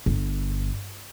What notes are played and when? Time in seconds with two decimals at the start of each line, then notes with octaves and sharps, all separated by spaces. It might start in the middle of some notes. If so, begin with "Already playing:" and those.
0.06 G1